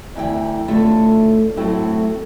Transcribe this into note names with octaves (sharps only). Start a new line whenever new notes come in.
D2 E3 E4 G5
A2 D3 A3 F4 A4 E5
A2 F#3 A3 C4 E4